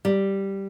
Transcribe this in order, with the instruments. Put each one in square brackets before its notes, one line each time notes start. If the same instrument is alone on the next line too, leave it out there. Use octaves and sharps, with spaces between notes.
[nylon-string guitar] G3